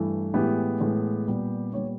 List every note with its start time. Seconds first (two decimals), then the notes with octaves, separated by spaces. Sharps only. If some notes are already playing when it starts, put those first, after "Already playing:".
Already playing: G2 E3 A3
0.34 A2 E3 G#3 B3 G4
0.80 A2 E3 G#3 B3
1.27 A#2 G3 B3
1.73 A#2 G3 B3 C#5